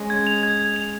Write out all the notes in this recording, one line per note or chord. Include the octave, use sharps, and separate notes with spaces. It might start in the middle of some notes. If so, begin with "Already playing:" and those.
Already playing: G#3 C#4
G#6
F7
G#6
G#6
F7